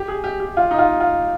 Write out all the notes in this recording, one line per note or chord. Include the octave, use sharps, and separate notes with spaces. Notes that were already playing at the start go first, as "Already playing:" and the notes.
Already playing: G4
G#4
G4
G4
F4
D#4
F4
F4